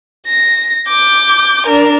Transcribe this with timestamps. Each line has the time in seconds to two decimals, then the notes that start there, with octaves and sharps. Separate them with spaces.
0.27 A#6
0.88 D6 G6
1.66 D4 A#4